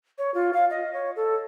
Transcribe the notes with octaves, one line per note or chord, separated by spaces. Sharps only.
C#5
F4
F5
D#5
C#5
A4